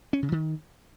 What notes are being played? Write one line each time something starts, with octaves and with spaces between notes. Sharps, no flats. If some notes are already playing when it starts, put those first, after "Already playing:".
C#4
C#3
D#3